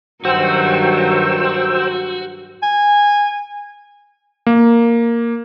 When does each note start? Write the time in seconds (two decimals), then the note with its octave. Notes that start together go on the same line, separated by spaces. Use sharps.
0.25 G2 D#3 F#3 F#4 C5 G5 E6
2.63 G#5
4.46 A#3